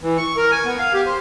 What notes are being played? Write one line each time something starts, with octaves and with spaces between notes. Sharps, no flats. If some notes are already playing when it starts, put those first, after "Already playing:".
E3
C#6
A#4
G#5
B3
F5
G4
C5